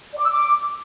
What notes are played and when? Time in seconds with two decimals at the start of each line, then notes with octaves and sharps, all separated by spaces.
0.13 D5
0.19 D6
0.24 E6
0.30 D6